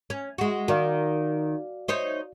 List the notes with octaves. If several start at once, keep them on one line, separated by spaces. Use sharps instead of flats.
C#4
G#3 F#4
D#3 F#4 D5 F5
D#4 C5 C#5